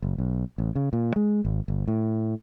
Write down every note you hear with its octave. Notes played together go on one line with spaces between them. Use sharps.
F#1
B1
A1
C#3
A#2
G#3
G#1
G1
A2